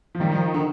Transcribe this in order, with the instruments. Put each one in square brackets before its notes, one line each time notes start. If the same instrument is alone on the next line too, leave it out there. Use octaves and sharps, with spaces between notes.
[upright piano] F3
[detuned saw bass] D#3 [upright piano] G3
[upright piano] F3
D3